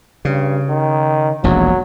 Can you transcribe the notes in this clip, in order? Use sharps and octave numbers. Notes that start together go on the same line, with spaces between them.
G2 C#3
D#3
E1 A#1 D#2 F#3